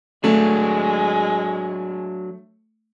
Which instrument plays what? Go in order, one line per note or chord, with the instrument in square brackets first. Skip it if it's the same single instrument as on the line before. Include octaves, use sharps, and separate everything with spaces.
[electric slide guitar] F#3 D4 [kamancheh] G#3 [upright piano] A3